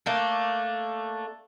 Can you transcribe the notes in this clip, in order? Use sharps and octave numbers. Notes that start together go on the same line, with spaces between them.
A3 A#3 D4